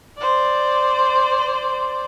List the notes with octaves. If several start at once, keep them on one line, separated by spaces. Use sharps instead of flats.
C5 D5